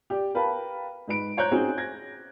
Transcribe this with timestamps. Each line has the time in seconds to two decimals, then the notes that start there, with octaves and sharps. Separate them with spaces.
0.10 G4 D5
0.35 A#4 B4 F5 G5 A5 B5
1.08 G#2 B4 D7
1.37 C5 C#5 A#5 F#6 G6
1.51 C4 C#4 D#4 F#4 G#4
1.78 G#6 A#6